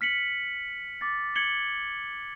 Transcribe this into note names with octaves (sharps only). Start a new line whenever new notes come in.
F6 B6 C#7 F#7
D6 A6
G#6 C#7 F#7 G7